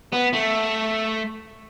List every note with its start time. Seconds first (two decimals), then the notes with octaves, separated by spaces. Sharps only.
0.13 B3
0.34 A3